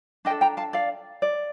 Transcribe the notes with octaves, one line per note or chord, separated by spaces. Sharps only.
D4 D#5 G5
A4
G5 A#5
F5 A5
D5 F5
D5